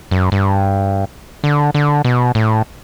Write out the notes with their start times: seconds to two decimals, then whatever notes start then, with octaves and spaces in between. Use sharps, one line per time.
0.11 F#2
0.32 G2
1.44 D3
1.75 D3
2.05 B2
2.35 A2